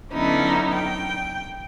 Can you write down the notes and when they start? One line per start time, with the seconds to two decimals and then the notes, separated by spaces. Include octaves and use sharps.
0.11 D3 F#3 B3 C#4 D#4 E4
0.72 G5